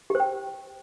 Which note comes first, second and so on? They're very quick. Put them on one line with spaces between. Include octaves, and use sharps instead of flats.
G4 C5 G5